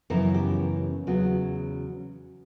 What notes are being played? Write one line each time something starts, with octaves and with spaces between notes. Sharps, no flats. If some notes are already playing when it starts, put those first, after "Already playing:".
F#2 C#3 E3 B3 A#4
G4
E2 C#3 F#3 B3 F#4